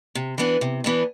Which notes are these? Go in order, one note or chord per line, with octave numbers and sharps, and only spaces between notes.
C3
E3 B3 D4
C3
E3 B3 D4